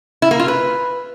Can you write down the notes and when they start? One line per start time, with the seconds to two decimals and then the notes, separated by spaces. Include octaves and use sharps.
0.22 E4
0.31 A#3
0.40 F4
0.48 B4